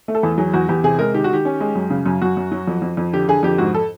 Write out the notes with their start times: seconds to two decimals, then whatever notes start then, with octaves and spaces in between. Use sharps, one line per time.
0.08 A3
0.15 A4
0.23 E2
0.38 F#3 G#4
0.53 E2 F#4
0.69 E2 G4
0.84 C3 G#4
0.99 G#3 A#4
1.14 D#3 G4
1.24 F#4
1.30 D#3 G4
1.45 C#4
1.60 G#3
1.75 F#2
1.90 C#3
2.06 F#2
2.22 F#2 F#4
2.37 F#2
2.52 F#3
2.67 F2
2.82 F2
2.97 F2
3.13 D3 G4
3.28 D3 G#4
3.43 F2 G4
3.58 G#2 F#4
3.74 A4